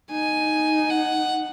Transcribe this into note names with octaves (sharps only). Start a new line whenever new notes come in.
D#4 G#5
F#5